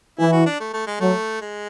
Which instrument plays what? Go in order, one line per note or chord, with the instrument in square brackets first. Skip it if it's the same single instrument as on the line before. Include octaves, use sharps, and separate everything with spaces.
[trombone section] E3 [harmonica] E4
[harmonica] F#4
D4
A3
A3
G#3
[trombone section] F#3 [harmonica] A3
[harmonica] G#3